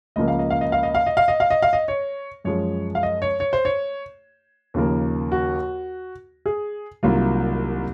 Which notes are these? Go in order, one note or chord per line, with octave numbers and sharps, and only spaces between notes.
C#2 C#3 F3 A#3 D#5
F5
D#5
F5
D#5
F5
D#5
F5
D#5
F5
D#5
F5
D#5
F5
D#5
C#5
F#2 F3 G#3 C#5
F5
D#5
C#5
C#5
C5
C#5
D#2 C#3 F3 A#3
F#4
G#4
C2 C3 D#3 F#3 A#3 F4